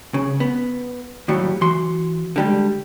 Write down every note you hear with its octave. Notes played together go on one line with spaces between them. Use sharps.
C#3
B3
D#2 A2 F#3 G3
E3 F#4 C6
D3 G3 G#3